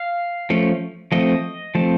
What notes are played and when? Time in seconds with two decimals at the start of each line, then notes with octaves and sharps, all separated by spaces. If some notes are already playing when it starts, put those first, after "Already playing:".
Already playing: F5
0.50 F3 A3 C#4
1.12 F3 A3 C4 D#5
1.75 F3 A3 C4